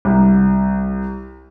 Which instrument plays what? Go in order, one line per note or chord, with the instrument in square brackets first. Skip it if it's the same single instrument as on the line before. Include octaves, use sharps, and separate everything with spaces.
[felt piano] C2